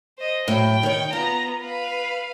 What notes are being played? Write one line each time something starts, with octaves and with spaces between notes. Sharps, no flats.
C5 D#5
A2 F#3 G5
D#3 C#5
B3 F4 A#5
B4 F5